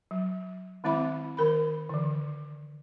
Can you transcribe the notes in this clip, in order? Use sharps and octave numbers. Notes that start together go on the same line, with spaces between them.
F#3
D#3 G#3 C4 E4 E5 B5
D#3 A#4 B5
D3 E3